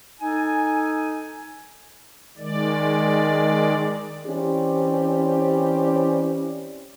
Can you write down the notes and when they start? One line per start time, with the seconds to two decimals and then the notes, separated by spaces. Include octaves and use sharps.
0.20 D#4 A4 G#5
2.38 D#3 G#3 D5
4.26 E3 C4 C#4 E4 G4 D5